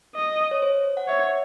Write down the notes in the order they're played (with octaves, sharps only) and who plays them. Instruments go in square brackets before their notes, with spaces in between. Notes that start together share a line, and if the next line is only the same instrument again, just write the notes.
[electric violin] D#5
[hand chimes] C#5
C5
F#5
[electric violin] C#5 [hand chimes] E5